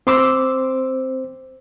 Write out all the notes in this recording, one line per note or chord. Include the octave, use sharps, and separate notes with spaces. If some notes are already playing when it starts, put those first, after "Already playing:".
C4 C5 C6 D6 E6